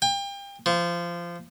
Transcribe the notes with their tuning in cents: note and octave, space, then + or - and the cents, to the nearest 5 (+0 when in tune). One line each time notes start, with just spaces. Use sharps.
G5 +30
F3 -20